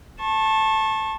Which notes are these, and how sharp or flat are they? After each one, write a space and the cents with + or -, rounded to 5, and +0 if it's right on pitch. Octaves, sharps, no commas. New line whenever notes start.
A5 +0 C#6 -35